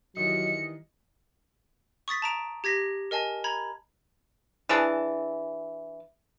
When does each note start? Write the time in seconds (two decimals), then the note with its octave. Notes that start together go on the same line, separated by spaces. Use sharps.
0.17 D#3 E3 F#3 G3 D#5 C#7
2.08 C#6 D#6 A6 B6
2.22 A5 A#5 D7
2.64 G4 G#6 A#6 B6
3.11 A#4 D#5 G#5 A5
3.44 A#5 B5 G#6
4.69 E3 D4 G#4 A5